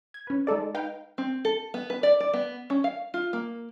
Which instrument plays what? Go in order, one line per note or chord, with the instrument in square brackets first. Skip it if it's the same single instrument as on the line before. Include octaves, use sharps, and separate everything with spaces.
[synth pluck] G#6
C#4 B4
G#3 D#4 A4 D5
G#3
D#4 B4 F5 G5
[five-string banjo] C4
A4
B3
B4
D5
D5
B3
C#4
F5
F4
A#3